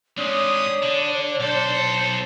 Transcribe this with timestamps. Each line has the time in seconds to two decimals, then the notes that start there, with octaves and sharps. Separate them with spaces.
0.18 G#2 C4 D4 G4 G#4 C#5 D#6
0.83 D3
1.40 B1 A4 C5